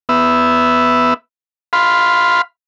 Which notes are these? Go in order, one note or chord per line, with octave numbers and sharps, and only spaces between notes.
B3 E5
F5 B5 C6